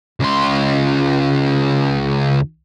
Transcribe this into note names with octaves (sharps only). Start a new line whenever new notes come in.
C#2 C6